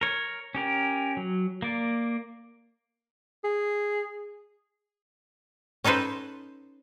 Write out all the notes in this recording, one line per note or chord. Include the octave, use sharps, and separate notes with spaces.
A#4 C#5
C#4 G4 A#4
F#3
A#3 D5
G#4
C#4 D#4 A4 B4 C5